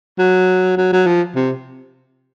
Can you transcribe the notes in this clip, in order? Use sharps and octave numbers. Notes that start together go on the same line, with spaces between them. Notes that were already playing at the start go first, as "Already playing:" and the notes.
F#3
F#3
F#3
F3
C3